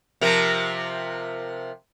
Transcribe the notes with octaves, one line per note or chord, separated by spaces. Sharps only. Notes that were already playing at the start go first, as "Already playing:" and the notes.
C3 F3 A#4